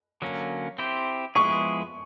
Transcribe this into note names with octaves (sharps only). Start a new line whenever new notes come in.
D3 F#3 A#3 C#4
C4 E4 G4 C5
F3 G#3 B3 E4 G#4 C#6